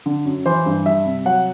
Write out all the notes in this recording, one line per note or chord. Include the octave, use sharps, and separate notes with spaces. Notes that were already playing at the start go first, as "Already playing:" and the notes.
D3
F#2
E3 C5
G2
G3 E5
C3
F#3 F#5